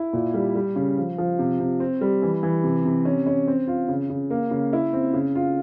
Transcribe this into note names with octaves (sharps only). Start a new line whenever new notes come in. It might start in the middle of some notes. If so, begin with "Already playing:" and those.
Already playing: E4
A#2
G3
G3
C#3
F3
F3
C3
C3
C4
G3
E3
E3
C3
C3
C#4
C#4
C4
F4
C#3
C#3
A#3
C#3
E4
C4
C#3
F4